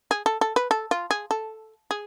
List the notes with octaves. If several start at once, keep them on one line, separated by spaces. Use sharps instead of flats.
G#4
A4
A4
B4
A4
F4
G#4
A4
G#4